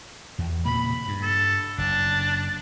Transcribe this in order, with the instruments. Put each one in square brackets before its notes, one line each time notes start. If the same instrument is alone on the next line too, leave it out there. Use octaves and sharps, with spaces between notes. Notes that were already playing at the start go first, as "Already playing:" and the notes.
[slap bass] E2
[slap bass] A#2 C#3 A#3 [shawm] B5
[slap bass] G2
[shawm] A4
[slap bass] F#1 [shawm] D4